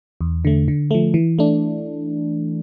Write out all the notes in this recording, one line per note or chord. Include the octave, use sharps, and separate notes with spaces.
E2
D3 A3
D3
F3 A3
E3
A3 D4